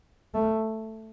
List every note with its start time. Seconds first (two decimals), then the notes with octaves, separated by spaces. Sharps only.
0.34 A3